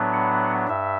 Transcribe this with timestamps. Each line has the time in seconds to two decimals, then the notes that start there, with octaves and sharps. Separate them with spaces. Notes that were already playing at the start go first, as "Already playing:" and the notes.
Already playing: A2 F#3 B3 D4
0.14 F#5
0.68 G2 E5